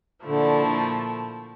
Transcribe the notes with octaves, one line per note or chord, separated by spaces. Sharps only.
A#2 D3 F3 A3 E4